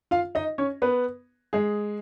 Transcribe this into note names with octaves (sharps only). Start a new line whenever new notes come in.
F4 F5
D#4 D#5
C#4 C#5
B3 B4
G#3 G#4